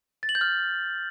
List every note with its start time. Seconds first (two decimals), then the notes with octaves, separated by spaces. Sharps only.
0.23 A6
0.29 F#7
0.35 G6
0.41 F6